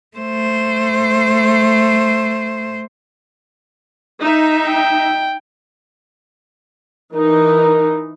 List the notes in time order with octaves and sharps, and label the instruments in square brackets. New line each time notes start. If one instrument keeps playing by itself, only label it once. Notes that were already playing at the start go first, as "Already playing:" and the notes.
[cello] A3 C5
[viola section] D#4 E5
[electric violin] G5
[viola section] E3 D#4 [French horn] A#4